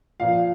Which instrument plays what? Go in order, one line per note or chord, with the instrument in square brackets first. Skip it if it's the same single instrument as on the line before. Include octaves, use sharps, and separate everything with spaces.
[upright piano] A#2 F3 F5